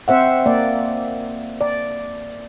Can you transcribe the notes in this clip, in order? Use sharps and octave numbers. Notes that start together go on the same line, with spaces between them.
C4 C5 E5 F#5
A#3 D5
D5